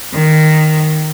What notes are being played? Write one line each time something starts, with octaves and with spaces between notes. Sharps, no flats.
D#3